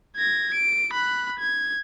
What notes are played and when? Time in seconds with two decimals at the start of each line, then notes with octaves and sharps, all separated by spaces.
0.17 G#6 A#6
0.54 D7
0.93 B5 F#6
1.39 G#6